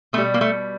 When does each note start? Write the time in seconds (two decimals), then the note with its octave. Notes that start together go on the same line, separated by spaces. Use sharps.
0.13 B2 A3
0.18 G3
0.34 A#3
0.41 A3